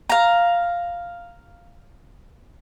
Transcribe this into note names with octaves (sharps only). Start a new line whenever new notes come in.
F5 A#5